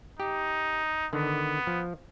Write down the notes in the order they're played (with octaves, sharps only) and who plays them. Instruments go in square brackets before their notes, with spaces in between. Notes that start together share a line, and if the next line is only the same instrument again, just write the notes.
[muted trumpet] D#4 [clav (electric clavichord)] G4
[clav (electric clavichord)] D3 D#3 [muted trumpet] B3
[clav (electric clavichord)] F3